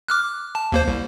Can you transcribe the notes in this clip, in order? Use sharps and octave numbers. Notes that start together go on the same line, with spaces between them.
D6 F6 F#6
A5
D#2 A#3 C5
C2